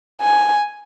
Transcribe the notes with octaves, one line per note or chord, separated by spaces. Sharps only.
G#5